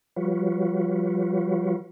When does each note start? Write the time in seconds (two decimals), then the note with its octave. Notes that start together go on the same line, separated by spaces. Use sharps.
0.16 F3 G3 F4 F#4 B4 C#5